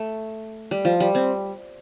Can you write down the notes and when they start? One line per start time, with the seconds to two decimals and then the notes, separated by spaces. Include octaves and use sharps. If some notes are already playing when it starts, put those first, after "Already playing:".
Already playing: A3
0.71 G3
0.85 F3
1.00 G3
1.15 C4